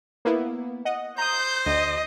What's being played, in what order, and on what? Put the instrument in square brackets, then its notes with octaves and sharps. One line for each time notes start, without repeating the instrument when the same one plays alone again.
[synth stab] A#3 B3 E4
D#5 F#5
[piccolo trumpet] C5 [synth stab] A#5 D#6 [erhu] G6
[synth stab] D2 [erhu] D#5